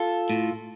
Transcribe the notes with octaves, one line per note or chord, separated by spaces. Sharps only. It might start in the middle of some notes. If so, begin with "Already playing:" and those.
Already playing: F4 A4
A2